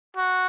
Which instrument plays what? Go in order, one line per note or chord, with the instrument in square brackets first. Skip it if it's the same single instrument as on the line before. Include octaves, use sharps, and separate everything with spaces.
[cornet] F#4